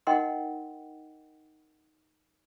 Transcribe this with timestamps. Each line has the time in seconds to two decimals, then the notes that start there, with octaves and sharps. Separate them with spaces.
0.07 D#4 A#4 D#5 F#5 G5 C6